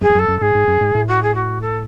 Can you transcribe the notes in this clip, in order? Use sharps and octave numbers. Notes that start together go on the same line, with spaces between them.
F#2 G#4
E2
F#2 A4
F#2
A4
G#2 G#4
G#2
F#2
G#2
A2
F#4
G#4
F#4
A4